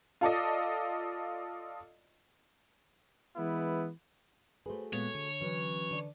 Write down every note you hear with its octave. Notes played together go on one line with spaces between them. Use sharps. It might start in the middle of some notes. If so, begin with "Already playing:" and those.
F4 A4 D5 D#5
E3 G#3 B3 E4
A3 F#4 G#4 B4 C5
A#2 G#3 B3 C#5
D3
E3 F#3 C#4
D3 D5